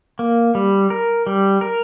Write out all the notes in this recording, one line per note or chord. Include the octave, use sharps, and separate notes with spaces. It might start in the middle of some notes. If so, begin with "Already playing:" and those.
A#3
G3
A#4
G3
A#4